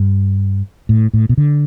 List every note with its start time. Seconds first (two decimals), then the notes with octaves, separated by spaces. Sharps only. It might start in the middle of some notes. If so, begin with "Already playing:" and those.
Already playing: G2
0.89 A2
1.14 A2
1.29 B2
1.37 D3